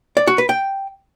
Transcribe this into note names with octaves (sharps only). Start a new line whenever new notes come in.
D5
F#4
B4
G5